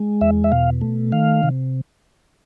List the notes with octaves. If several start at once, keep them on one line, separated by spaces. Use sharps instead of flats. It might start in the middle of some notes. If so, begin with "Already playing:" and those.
Already playing: G#3
E2 E5
E5
B2 F5
A3
D#3 F5
C3